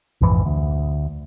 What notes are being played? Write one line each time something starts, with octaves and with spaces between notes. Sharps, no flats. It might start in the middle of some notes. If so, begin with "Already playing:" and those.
A#1 F2 G#2 E3
D2